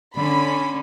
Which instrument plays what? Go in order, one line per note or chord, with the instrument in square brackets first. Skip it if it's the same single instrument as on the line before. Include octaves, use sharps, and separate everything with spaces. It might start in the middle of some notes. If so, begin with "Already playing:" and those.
[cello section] D3 C#4 [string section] B5